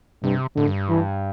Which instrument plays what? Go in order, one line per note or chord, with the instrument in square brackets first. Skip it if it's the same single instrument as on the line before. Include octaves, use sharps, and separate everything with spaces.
[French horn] G2 [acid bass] C3
[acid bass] A2 [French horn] D3
[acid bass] G2
[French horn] E3